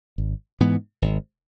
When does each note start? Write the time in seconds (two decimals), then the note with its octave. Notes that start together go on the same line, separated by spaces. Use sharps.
0.18 G#1
0.60 G#2 E3 B3
1.02 G#1